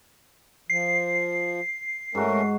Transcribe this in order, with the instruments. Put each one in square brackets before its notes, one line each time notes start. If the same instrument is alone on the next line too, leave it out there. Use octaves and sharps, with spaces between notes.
[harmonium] F3 [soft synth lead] C7
[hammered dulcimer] G#2 F#4 [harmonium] A3 C#4 A#4